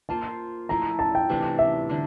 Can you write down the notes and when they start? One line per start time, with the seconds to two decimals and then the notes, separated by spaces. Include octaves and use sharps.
0.09 A#3 F4 C5 A5
0.69 F3 A3 E4 A#5
0.99 A5
1.15 G5
1.29 C3 E3 A3 D4
1.59 E5
1.89 D3 G3 D4